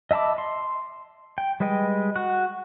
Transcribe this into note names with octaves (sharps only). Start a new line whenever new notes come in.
D#5 E5 A5 B5 D6
C6
G5
G3 G#3 B4 D#5 G5
F#4 F#5